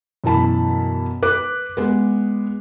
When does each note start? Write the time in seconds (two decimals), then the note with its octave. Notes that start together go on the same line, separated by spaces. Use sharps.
0.24 F#2 B2 E3 A5 B5
1.23 B4 D6 F#6
1.77 G#3 B3